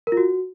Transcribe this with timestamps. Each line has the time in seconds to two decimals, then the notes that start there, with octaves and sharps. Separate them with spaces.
0.07 A#4
0.12 F4
0.17 F#4